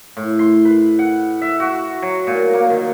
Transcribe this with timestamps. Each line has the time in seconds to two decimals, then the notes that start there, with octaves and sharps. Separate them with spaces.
0.17 A2
0.39 C6
0.65 B4
0.99 F#5
1.42 E5
1.60 F#4
2.02 F#3
2.27 A#2
2.53 A#3
2.70 D#3